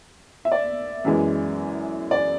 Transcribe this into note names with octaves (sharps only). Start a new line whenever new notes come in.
E5
D5
F#2 E3 G#3
D5